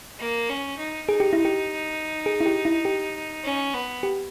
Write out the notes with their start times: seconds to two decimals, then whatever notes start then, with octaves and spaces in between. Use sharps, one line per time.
0.19 A#3
0.49 C#4
0.78 D#4
1.08 D#4 G#4
1.20 G4
1.33 E4
1.45 G4
2.26 G#4
2.41 E4
2.46 G4
2.65 E4
2.85 G4
3.44 C#4
3.74 B3
4.03 G4